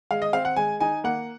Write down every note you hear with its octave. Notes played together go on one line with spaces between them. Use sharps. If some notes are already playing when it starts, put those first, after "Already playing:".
G#3 F5
D#5
C4 F5
F#5
G#3 G#5
D#4 G#5
A#3 F#5